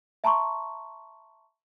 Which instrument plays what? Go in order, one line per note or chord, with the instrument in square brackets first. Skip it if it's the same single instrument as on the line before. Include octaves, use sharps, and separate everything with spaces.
[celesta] E5 A5 A#5 C6 C#6